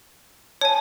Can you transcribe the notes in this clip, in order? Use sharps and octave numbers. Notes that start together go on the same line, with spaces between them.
C#5 G#5 A5